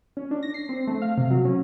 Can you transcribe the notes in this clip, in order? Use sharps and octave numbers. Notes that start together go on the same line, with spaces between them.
C#4
D4
A#6
C7
C4
A3
F5
C3
F#3
C#4